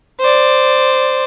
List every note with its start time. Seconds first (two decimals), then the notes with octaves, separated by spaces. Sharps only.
0.20 C5 D5